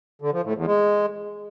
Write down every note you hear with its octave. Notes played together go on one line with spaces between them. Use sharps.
D3
F3
A2
E2
G#3